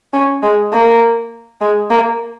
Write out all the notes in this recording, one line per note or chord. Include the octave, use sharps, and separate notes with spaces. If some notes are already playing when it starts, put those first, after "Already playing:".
C#4
G#3
A#3
G#3
A#3